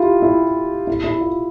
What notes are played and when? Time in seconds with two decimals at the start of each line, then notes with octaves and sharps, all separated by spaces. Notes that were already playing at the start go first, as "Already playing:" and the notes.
Already playing: E4 F4 G4
0.22 E4
0.87 E4
1.04 E4
1.21 F4